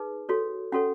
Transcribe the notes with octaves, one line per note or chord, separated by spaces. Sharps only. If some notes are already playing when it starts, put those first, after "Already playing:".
Already playing: D#4 G#4 B4
F#4 A4 C#5
C#4 F#4 A4 C#5 F#5